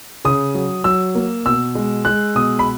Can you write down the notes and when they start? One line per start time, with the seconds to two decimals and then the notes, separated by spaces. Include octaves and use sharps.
0.25 C#3 D#6
0.55 F#3
0.84 F#3 E6
1.15 A#3
1.45 B2 E6
1.75 G#3
2.05 G#3 F#6
2.35 B2 D#6
2.59 B5